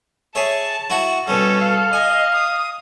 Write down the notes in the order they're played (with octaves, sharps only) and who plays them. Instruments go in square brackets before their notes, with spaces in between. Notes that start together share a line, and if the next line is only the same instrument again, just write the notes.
[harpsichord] G#4 C#5 E5 [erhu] A5
[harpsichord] E4 F#4 F#5
[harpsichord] B2 G3 [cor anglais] C#4 [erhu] A4
[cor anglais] F5
[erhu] D#5 [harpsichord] G#5
[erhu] D#6